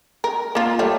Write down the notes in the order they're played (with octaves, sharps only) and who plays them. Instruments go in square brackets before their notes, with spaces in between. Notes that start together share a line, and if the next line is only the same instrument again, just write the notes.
[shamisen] A#4
A#3 F4
G3 A3 C#5